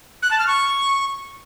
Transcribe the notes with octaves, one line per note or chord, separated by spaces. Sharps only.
F#6
A5
F6
C#6